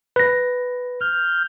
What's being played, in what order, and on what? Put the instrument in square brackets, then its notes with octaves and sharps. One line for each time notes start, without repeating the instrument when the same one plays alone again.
[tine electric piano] B4 A#6
[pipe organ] F6 G6